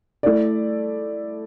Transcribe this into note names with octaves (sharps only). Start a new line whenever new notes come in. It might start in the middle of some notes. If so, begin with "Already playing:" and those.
A3 E4 A4 D5